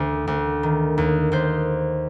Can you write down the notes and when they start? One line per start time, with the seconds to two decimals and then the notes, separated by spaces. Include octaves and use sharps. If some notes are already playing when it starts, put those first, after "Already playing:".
Already playing: D2
0.27 D2
0.63 D#3
0.98 D#2
1.32 D#2 C5